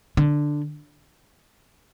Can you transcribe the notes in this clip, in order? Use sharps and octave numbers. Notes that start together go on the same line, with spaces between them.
D3